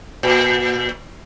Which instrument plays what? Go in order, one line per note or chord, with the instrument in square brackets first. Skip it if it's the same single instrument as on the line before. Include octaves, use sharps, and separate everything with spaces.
[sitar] A#2